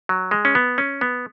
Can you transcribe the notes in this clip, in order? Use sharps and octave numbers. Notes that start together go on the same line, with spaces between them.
F#3
G#3
C#4
B3
C#4
B3